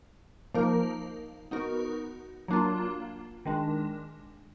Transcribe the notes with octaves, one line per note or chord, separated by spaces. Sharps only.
F3 A#3 D#4 A#4
B3 D#4 F#4 A#4
F#3 A#3 D4 F4
D#3 G#3 D4